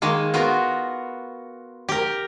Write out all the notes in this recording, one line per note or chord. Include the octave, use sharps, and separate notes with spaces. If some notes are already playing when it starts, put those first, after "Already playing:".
D#3 G#3 A#3
B3 F4 F#4 A#4
G4 A#4